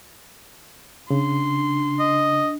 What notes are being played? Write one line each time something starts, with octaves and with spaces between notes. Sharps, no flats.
C#3 D4 C6
D#5